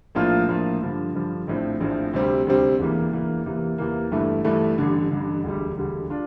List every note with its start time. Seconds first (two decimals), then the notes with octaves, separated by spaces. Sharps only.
0.15 A#1 A2 F3 A#3 F4
0.48 A#1 A2 F3 A#3 F4
0.82 G2 D3 F3
1.15 G2 D3 F3
1.47 A#1 A2 F3 C4
1.80 A#1 A2 F3 C4
2.13 D2 C3 G3 C4
2.47 D2 C3 G3 C4
2.79 E1 E2 E3 A#3
3.13 E1 E2 E3 A#3
3.46 E2 C3 E3 A#3
3.78 E2 C3 E3 A#3
4.11 G1 G2 E3 A3
4.44 G1 G2 E3 A3
4.78 A1 G2 D3
5.11 A1 G2 D3
5.44 E1 D2 D3 G3
5.77 E1 D2 D3 G3
6.10 D4 F4